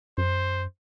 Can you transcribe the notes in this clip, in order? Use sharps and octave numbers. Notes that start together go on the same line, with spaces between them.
F#2 C5